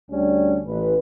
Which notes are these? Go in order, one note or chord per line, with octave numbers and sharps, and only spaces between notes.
D2 G3 C#4 D4
A1 B4